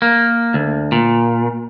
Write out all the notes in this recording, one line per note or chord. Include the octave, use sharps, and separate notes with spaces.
A#3
D2
A#2